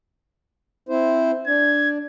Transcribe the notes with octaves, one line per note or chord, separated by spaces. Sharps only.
C4 E4 C5
D4 G#6